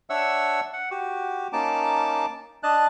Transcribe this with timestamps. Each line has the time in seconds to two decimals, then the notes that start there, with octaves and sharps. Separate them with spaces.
0.10 D4 C#5 E5 F#5 E6
0.73 F#5
0.91 F#4 G4
1.53 A#3 C#4 D#4 A5 D6
2.63 D4 D#5 A5 F#6